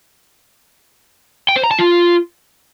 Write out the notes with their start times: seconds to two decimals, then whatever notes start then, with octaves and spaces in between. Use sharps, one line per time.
1.49 G5
1.56 C5
1.64 A#5
1.71 A5
1.79 F4